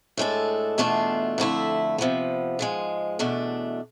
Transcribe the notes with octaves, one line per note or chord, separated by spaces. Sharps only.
A2 G#3 D4 A4
E2 B2 A3 D4 F4
F2 D3 A3 E4
C3 F3 B3
G#2 F3 G#3
E2 B2 A3 D4